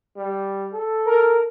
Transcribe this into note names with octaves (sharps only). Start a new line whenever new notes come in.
G3
A4
A#4